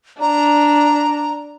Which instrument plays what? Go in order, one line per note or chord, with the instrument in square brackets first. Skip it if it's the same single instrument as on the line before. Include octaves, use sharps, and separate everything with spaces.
[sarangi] D4 [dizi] A#5